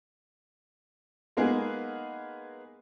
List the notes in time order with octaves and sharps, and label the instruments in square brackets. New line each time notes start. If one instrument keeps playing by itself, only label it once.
[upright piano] G#3 A#3 B3 D#4 G#4 A#4